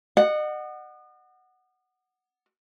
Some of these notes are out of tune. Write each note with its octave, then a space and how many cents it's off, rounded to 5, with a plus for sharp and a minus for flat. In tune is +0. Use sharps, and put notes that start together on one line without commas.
D#5 -40 F#5 +0